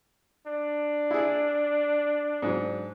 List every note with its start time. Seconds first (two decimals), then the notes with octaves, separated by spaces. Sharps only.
0.47 D4
1.11 E4 G#4
2.42 G#2 F#3